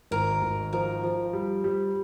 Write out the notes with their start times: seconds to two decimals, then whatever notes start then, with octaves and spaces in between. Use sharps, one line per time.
0.11 G#1 A#4
0.42 G#1
0.73 F3 A#4
1.03 F3
1.33 G3
1.64 G3